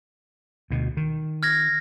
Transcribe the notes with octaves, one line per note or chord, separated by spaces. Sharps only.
D2 B2
D#3
F6 G#6 A#6